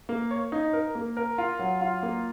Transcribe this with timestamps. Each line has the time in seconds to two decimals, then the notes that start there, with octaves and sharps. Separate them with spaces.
0.09 A#3
0.31 C#5
0.52 D#4
0.73 A#4
0.95 A#3
1.17 A#4
1.38 F4
1.59 F#3
1.81 F4
2.03 A#3